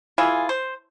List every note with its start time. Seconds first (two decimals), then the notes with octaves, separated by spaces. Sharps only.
0.18 E3 E4 F4 G#4
0.49 C5